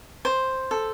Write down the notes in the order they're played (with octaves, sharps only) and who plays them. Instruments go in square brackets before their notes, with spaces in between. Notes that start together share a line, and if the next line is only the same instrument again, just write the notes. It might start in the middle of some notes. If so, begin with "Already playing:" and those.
[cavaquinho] C5
A4